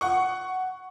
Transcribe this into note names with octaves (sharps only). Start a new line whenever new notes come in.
F#5 C#6